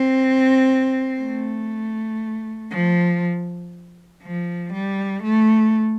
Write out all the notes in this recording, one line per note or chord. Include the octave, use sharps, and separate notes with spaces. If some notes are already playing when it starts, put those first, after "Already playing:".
Already playing: C4
A3
F3
F3
G3
A3